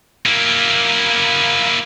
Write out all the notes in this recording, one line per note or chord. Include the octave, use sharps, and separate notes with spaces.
A#3 E4